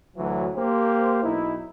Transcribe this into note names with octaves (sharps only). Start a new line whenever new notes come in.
D2 E3 F#3
A#3 G4 C5
B1 D#4 E4